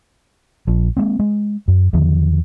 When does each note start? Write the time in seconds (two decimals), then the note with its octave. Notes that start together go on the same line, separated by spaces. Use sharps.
0.67 A#1 F3
0.97 G#3 A#3 C4
1.19 G#3
1.68 F#2
1.93 E2 D3 D#3 F3